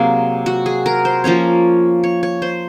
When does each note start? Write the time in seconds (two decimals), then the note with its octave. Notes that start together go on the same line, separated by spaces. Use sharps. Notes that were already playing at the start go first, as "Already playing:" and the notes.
Already playing: C3 F#3 A#3 G#4
0.46 F#4
0.66 G#4
0.86 A#4
1.05 C5
1.24 F3 A#3 C#4 C#5
2.04 C#5
2.23 C#5
2.42 C5